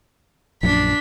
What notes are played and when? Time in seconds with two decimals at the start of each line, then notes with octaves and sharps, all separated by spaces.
0.63 A#1 F#2 A#2 D4 B6